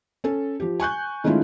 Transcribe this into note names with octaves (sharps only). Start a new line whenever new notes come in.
C#4 A4
F3 G4
G#5 C#6 F#6 G6
D#3 G#3 A3 C#4 E4 F4